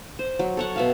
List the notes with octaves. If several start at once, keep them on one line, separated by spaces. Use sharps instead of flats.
C5
F#3
A4 C#5 F#5
B2 E5 F5